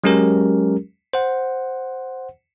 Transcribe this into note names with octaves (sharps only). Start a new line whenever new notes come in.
F#3 G#3 C#4 G4 A#4
C5 F#5